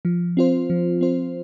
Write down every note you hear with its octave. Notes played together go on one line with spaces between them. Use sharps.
F3
C4 F4 C5
F3
C4 F4 C5